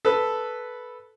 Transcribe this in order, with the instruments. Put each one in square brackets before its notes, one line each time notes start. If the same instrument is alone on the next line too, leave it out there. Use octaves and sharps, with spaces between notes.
[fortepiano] A4 B4